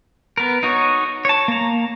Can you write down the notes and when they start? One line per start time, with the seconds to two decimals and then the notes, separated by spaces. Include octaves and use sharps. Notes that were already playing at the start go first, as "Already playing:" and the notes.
0.37 B3 A#4
0.63 D#4 F#4 C#5
1.25 C#5 A5
1.48 A#3 A#5